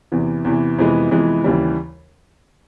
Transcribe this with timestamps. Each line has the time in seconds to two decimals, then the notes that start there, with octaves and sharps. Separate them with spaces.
0.12 E2 C3 E3
0.45 E2 C3 E3
0.78 F2 C3 E3 G#3 B3
1.11 F2 C3 E3 G#3 B3
1.44 D#2 C#3 E3 G3